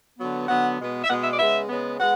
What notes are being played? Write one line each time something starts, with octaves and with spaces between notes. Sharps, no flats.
D3 F#3 B3
D3 F#3 B3 F#5
B2 G#3 B3
E5
B2 G#3 B3 F#5
E5
D5
C#3 G#3 B3 E5
C#3 G#3 B3
G#3 B3 F#5